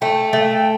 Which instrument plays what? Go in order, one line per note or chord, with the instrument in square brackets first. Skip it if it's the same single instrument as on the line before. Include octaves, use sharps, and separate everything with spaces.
[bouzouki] A3 [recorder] G5
[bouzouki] A3